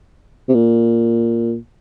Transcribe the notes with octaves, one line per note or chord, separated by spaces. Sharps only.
C3
A#2